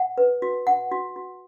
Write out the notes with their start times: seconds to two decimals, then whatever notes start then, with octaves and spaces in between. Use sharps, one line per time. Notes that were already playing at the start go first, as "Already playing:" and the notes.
Already playing: F#5
0.18 B4
0.42 F#4
0.67 F#5
0.92 F#4
1.16 F#4